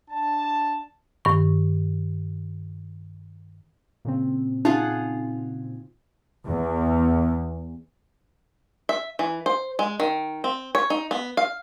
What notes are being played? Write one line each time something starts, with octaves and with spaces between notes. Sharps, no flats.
D4 A5
G2 D#3 C#6
A#2 C#3 C4
D#4 F4 G#4 F#5
E2
E5
E3
C5
G#3
D#3
C4
C#5
D#4
B3
F5